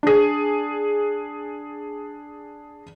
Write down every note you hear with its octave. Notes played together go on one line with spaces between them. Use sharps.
D4 G#4